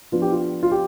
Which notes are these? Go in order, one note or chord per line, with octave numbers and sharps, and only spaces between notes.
F3 B3 D4 F4
G4
F4
F4
G4